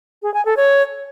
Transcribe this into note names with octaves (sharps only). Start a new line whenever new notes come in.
G#4
G#5
A4
C#5